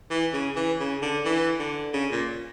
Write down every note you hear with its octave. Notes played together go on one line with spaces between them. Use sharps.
E3
C#3
E3
C#3
D3
E3
D3
C#3
A#2